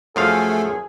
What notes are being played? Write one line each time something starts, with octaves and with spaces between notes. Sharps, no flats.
F#2 F3 A3 G#4 F5